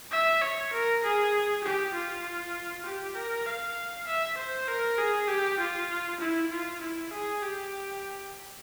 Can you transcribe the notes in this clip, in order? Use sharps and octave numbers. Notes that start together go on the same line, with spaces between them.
E5
C#5
A#4
G#4
G4
F4
G4
A#4
F5
E5
C5
A#4
G#4
G4
F4
E4
F4
E4
G#4
G4